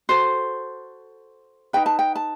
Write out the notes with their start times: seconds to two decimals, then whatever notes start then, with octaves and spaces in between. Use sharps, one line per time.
0.09 F#4 A4 C5
1.73 D#4 G4 B4 G5
1.86 A5
1.99 G5
2.16 A5